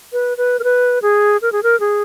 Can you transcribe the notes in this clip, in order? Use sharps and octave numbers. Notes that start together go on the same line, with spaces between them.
B4
B4
A#4
B4
G#4
A#4
G#4
A#4
G#4